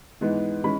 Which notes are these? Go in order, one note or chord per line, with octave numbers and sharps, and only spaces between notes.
G#2 E3 G#3 B3
E3 G#3 C#4 B5